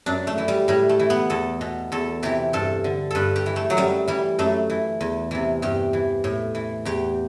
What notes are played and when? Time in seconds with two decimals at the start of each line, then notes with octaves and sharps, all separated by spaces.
0.06 F#2 D4
0.27 A3
0.38 E3
0.48 G3
0.68 A2 G3
0.89 A3
0.99 E3
1.10 B3
1.30 E2 A4
1.61 B2
1.92 E2 A4
2.23 C3 E3 G4
2.53 G2 A4
2.84 D3
3.11 G2 A4 B4
3.36 G4
3.46 E3
3.56 A3
3.70 F#3
3.77 F#2 G3
4.08 E3 G3
4.39 F#2 A3
4.70 E3
5.01 E2
5.31 C3 E3
5.62 G2 G4
5.93 E3
6.24 A2
6.55 E3
6.85 E2 G4